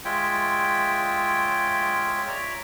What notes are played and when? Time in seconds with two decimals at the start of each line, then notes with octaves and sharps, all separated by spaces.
0.05 G#3 F4 C#5 E5 G5
2.28 C#5 D5 E5 A#5